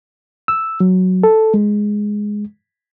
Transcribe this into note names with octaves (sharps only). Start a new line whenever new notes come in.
E6
F#3
A4
G#3